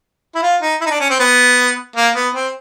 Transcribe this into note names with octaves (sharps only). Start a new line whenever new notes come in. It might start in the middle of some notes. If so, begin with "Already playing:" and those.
E4
F4
D#4
E4
D#4
D4
C#4
C4
B3
A#3
B3
C4